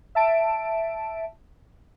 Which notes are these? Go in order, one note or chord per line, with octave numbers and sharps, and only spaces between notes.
E5 A5 D7